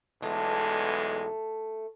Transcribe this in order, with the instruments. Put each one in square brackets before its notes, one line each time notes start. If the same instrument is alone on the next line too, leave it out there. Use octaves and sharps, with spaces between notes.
[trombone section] B1 E2 G#3 [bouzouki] A3